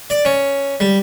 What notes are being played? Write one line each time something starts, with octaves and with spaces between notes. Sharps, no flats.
D5
C#4
G3